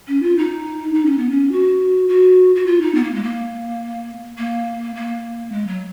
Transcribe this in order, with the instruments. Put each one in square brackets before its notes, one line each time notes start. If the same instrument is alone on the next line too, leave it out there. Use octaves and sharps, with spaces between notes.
[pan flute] C#4
F4
D#4
D#4
C#4
B3
C#4
F#4
F#4
F#4
F4
D#4
B3
A#3
G#3
A#3
A#3
A#3
G#3
F#3